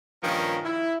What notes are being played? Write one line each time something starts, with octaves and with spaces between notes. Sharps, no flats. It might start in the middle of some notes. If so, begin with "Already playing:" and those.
G2 A#2 D#3 F3 C#4 A#4
E4